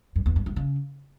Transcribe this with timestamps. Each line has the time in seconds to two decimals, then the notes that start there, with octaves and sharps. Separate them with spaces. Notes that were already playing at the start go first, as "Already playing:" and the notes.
0.16 F#2
0.26 E2
0.36 G2
0.46 G2
0.56 C#3